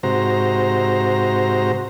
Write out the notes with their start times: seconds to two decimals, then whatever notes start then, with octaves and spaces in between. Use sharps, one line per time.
0.03 G#2 C3 F#4 C5 A#5